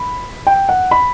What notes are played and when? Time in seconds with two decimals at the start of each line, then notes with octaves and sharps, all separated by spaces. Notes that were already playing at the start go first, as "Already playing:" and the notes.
Already playing: B5
0.47 G5
0.69 F#5
0.91 B5